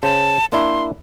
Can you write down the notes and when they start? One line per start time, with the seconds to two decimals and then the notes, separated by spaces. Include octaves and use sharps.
0.03 C#3 C5 A5
0.52 A#3 D4 E4 C6